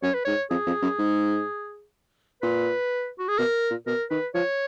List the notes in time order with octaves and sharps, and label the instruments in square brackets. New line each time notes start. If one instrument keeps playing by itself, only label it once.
[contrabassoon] F#2 [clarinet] C#5
[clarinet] B4
[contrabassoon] G#2 [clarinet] C#5
[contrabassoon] F2 [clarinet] G#4
[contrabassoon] F2
F#2
G#2
[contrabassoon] A#2 [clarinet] B4
[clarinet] F#4
G#4
[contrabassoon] B2 [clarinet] A#4
[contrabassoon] A#2
[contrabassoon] B2 [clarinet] A#4
[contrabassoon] D#3 [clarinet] B4
[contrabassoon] F3 [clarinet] C#5